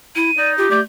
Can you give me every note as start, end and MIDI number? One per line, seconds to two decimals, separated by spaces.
0.16 0.30 64
0.16 0.49 99
0.38 0.66 63
0.38 0.53 74
0.58 0.66 65
0.58 0.80 67
0.71 0.81 57
0.71 0.80 74
0.71 0.81 91